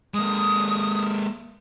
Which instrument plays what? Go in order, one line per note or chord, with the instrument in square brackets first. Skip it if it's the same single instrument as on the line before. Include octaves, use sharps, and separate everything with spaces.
[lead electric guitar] G#3 A#3 [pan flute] D#6